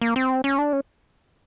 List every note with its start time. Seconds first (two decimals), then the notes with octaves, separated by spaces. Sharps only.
0.01 A#3
0.16 C4
0.44 C#4
0.58 D4
0.73 C#4